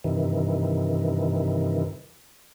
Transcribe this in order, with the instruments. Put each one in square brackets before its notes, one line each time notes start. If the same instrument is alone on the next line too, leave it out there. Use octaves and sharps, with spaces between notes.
[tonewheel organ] G2 C3 D#3 E3